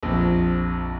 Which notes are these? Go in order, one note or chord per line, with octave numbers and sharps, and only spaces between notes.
A#1 F2